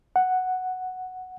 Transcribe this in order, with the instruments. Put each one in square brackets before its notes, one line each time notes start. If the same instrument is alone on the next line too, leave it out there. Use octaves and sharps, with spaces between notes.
[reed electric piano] F#5